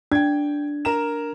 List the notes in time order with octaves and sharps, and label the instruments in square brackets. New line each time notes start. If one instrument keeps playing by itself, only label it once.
[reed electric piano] D4 [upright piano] G5 G#6
[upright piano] A#4 A#5 E7